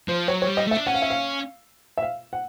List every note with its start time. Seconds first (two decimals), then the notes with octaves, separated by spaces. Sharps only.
0.08 F3 C5
0.28 F#3 C#5
0.42 C#5
0.47 G3
0.57 D#5
0.67 A3 E5
0.77 D4
0.87 C#4 F#5
0.94 F5
1.02 E5
1.10 F5
1.97 E5
2.02 F5
2.33 F#5